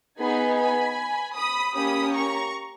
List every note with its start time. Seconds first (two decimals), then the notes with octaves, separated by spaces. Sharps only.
0.19 B3 D#4 G#4 G#5 B5
0.57 G#5 B5
1.36 B5 D#6
1.74 A#3 C#4 G4 B5 D#6
2.14 A#5 C#6